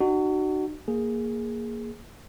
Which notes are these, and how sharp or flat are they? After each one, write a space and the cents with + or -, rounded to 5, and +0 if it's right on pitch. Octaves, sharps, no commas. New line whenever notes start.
D#4 -45 F#4 +20
A#3 +0 G#4 +0